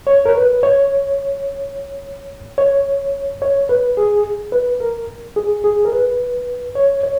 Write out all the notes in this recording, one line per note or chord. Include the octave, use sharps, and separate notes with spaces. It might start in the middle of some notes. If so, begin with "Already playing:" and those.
C#5
A#4
B4
C#5
C#5
C#5
B4
G#4
B4
A#4
G#4
G#4
A#4
B4
C#5
C#5